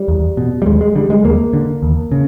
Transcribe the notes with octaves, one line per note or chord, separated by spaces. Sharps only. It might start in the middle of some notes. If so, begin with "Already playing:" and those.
Already playing: G3
E2
B2
G3
D#2 G#3
G#3
D3 G3
G#3
D#2 A#3
D3
D#2
C#3